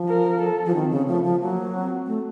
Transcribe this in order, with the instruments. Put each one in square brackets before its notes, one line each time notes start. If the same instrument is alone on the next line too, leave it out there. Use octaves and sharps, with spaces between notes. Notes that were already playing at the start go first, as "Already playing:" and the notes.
Already playing: [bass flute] F3
[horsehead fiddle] A#4
A4
[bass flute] F3
[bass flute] D#3 [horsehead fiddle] C4
[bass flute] C#3
[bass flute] F3 [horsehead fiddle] A3
[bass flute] F3
[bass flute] F#3 [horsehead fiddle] A#3
[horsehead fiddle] C4
[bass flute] A3